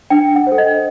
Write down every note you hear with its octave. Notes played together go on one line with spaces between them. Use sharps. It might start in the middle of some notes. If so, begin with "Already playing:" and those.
D4 G5
F#5
A4 C5
D#5